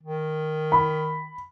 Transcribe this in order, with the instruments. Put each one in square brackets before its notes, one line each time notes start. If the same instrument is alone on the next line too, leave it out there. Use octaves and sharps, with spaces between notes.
[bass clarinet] D#3
[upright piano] B5